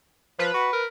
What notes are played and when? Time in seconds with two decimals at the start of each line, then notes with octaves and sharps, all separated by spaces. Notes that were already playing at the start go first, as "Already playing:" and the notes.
0.39 F3 B4
0.54 F#4
0.73 A#4